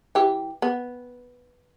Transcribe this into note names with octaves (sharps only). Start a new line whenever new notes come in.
E3 G4
B3